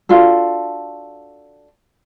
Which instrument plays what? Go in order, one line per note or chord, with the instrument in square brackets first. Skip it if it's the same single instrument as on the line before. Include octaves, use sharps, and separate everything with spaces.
[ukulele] D4 F4 F#4 A4